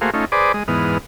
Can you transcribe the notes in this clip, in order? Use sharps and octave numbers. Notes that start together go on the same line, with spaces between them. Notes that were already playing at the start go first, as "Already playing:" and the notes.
A3 A#3 F#4 G#4 C5 F5
A3 C#4 D#4 F4
G#4 B4 C5 D5 D6 D#6
G#3 D#6
E2 G#2 B3 D#6 F6